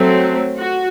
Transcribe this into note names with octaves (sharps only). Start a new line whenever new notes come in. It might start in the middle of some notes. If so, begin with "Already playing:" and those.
Already playing: F#3 A3 C4
F#4